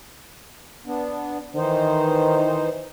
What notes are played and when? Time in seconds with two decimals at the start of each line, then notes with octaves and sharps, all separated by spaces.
0.86 B3 D4
1.55 D#3 E3 D#4 C5